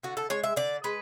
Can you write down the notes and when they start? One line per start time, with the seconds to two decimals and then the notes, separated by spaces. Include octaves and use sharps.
0.03 D3 F#4
0.17 A4
0.30 G#3 C#5
0.43 E5
0.56 D3 D5
0.84 G#3 B4